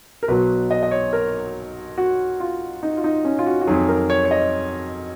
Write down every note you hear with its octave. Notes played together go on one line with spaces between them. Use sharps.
A#4
B1 B2 F#3 B4
D#5
D#5
C#5
A#4
F#4
F4
D#4
F4
D#4
C#4
F4
F#4
F#4
F2 D#3 F#3 G#4
A#4
C#5
C#5
D#5